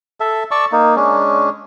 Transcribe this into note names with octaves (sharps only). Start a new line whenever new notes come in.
A4 E5
D5 A5 C#6 E6
A#3 D#4
G#3 C#4 D4